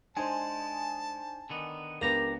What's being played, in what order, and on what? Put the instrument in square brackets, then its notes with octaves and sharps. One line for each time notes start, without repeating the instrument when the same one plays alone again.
[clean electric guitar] G#3 [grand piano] D4 D#4 C5 [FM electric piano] G#5 [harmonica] A5
[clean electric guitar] D3 D#3 B3
[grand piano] C#2 B3 [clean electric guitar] D4 G4 A#5 [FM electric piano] A#4